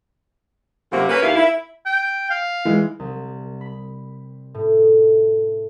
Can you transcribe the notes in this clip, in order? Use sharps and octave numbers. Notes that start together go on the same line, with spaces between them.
F#2 C3 F3 A#3 F#4
A#3 C#4 B4
D#2 A#3 E4 F5
E4
G5
F5
E3 G#3
C2
B5
A2